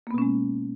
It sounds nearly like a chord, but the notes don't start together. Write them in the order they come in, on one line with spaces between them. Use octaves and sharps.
A#3 B3 B2 C#4 G#3